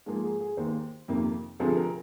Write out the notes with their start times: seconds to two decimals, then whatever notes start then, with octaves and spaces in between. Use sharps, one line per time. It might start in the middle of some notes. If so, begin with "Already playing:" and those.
0.06 G#2 F3 A#3 G#4
0.24 G#4
0.40 G#4
0.57 D#2 D#3 A#3 C5
1.08 F2 C3 D#3 A#3
1.60 D2 C3 F3 G#4
1.77 A#4